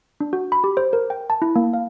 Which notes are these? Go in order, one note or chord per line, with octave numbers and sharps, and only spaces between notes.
D4
F#4
B5
G4
C5
A#4
G5
A5
E4
A#3
F5